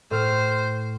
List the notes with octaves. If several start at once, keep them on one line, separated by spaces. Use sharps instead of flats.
A2 C5 F6